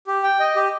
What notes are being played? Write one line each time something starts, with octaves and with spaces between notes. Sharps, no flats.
G4
G5
D#5
G4